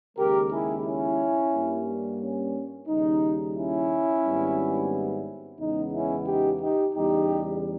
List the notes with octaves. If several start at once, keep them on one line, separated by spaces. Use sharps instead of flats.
D#2 C#3 G#3 G4 A#4
E4 G#4
C#4 E4
G2 G3 A#3
C#4
D#2 C#3 G3 D#4
C#4 E4
G#1 G#2 G3 B3
E2 C#3 G#3 B3 D#4
C#4 E4
D#4 G4
D#4 G4
E2 C#3 G3 D#4 G4